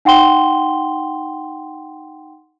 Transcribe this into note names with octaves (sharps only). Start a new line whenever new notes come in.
D#4 F#5 G5 C6 G7